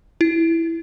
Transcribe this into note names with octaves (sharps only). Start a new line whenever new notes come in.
E4